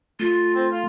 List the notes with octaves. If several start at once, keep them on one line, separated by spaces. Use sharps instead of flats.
A3 F4
C4
F4